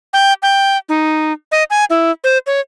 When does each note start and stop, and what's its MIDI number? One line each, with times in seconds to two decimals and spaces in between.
0.13 0.33 79
0.43 0.77 79
0.89 1.33 63
1.52 1.63 75
1.70 1.85 80
1.90 2.11 64
2.24 2.38 72
2.47 2.60 73